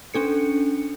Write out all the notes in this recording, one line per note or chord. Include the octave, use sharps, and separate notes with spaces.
C#4 D4 A4 C#7